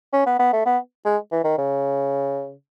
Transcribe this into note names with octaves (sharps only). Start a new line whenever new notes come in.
C#4
B3
B3
A3
B3
G#3
E3
D#3
C#3